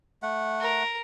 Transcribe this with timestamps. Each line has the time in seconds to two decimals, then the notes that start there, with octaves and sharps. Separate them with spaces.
0.22 A3 F#5
0.61 A#4